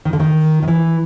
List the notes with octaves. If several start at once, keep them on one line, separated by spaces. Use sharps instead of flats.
D#3
D3
D#3
D#3
E3